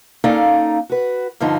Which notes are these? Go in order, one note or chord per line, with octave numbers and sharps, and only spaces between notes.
A#3 C#4 D#4 A4 D5 F5
F#4 B4
G2 D3 F3 D#4